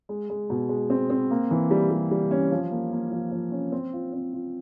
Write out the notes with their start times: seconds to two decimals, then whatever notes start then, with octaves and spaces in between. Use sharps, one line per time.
0.09 G#3
0.30 G#3
0.50 B2
0.69 G#3
0.90 C4
1.10 C4
1.31 A#3
1.51 E3
1.71 G3
1.91 G3
2.11 G3
2.31 C#4
2.52 F3
2.71 A#3
2.92 A#3
3.11 F3
3.32 F3
3.52 C#4
3.72 C4
3.93 F4
4.13 C4
4.33 F4